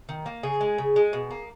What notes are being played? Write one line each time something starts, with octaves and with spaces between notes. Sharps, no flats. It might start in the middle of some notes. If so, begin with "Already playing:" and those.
D#3
A#3
C#3 G#4
G#3
C#3
G#3
B2
A#3